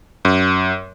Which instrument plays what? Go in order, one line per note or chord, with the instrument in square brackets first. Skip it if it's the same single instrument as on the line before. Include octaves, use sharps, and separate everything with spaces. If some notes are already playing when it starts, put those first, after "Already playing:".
[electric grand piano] F#2